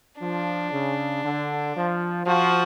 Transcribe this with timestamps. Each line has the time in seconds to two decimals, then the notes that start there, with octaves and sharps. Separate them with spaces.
0.20 F3 D4
0.71 C#3
1.24 D3
1.75 F3
2.26 F3 F#4